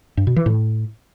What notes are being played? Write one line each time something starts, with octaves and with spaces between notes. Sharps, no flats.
G2
B2
E3
A2